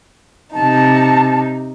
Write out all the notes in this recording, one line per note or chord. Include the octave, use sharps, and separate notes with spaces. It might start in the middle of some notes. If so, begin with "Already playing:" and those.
C3 D#4 A5